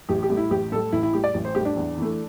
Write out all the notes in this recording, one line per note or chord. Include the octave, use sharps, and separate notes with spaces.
A1 G4
G4
A2 G3
E4
A1 G4
A2 G3 A4
A1 E4
E4
A2 G3 G4
D5
A1
C5
A2 G3 G4
D4
E2
E3 A3